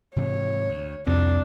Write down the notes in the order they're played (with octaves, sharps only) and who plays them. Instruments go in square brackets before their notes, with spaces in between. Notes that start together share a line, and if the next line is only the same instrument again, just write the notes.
[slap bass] G#2 C3 E3 [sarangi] C#5
[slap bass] D2
[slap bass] C2 C3 C4 [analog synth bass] F2 [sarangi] D4